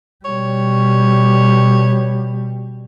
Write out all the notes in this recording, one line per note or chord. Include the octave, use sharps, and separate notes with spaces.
B2 G3 C#5